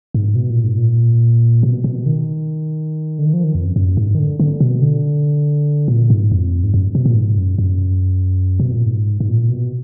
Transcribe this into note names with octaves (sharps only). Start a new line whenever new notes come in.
G#2
B2
A#2
G#2
A#2
B2
B2
D#3
D3
D#3
F3
D#3
F2
F#2
F#2
G#2
D#3
D3
D3
B2
D3
A#2
G#2
F2
G#2
F#2
B2
A#2
G#2
F#2
F#2
B2
A#2
G#2
G#2
A#2
B2